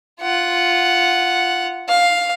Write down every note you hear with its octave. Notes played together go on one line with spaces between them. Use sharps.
F4 F#5
F5